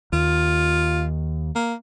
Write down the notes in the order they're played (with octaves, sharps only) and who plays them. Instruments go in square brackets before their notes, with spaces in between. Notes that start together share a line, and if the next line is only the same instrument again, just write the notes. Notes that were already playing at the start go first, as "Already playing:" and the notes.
[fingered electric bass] D#2 [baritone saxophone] F4
[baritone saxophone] A#3